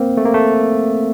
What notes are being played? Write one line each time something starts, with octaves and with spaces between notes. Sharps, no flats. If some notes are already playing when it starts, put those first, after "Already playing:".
Already playing: A#3 C4
A3
A#3
A3